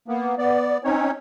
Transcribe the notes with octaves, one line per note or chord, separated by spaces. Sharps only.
A#3 B3
B3 D5
C4 C#4 D#4 C#5